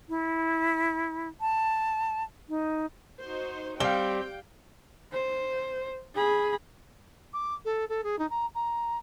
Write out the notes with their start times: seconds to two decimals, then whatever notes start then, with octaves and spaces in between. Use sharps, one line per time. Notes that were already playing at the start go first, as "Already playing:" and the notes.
0.09 E4
1.41 A5
2.49 D#4
3.21 D#4 F#4 C5
3.80 G3 C4 F5 G5 G7
5.12 C5
6.15 G#4 B5
7.33 D6
7.65 A4
7.89 A4
8.04 G#4
8.19 D#4
8.30 A#5
8.55 A#5